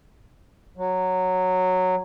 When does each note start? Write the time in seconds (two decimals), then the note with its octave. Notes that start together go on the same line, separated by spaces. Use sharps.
0.77 F#3